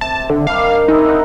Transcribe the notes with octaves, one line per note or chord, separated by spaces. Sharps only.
C3 A5
D3
D#3 G3 D4 F5
G#3 C4 D#4 E4
A#4 D#5 F#5